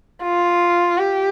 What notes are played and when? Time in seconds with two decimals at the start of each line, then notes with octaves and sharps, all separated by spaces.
0.23 F4
0.98 G4